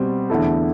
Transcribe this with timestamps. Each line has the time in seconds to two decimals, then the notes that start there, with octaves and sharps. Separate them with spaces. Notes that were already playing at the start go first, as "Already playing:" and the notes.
Already playing: B2 G3 C4
0.30 E2 D3 A3 E4 A4